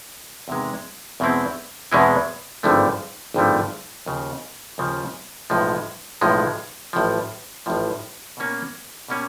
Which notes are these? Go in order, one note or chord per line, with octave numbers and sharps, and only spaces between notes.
E2 C3 D#3 G#3
E2 B2 G#3 C4 E4
E2 B2 G#3 C4 E4
G#1 G2 D3 F3 A3
G#1 G2 D3 F3 A3
D#2 C#3 F3
D#2 C#3 F3
B1 A2 F3 G#3
B1 A2 F3 G#3
A1 A2 F3
A1 A2 F3
B2 G3 A#3 C#4
B2 G3 A#3 C#4